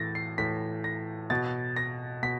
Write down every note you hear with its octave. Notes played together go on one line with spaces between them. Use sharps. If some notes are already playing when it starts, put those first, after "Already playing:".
Already playing: A2 E3 A6 A#6
C7
A2 E3 B6
A#6
B2 A6
A#6
B2 B6